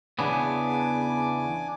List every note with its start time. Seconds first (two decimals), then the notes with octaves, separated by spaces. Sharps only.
0.19 E2 C#3 B3 D4 G#5 D6